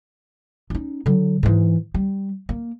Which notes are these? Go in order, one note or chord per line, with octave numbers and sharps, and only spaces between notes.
C#4 D#4
D3 F#3
G#2 E3
G3
A#3